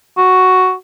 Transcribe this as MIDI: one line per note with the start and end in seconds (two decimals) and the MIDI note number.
0.17 0.74 66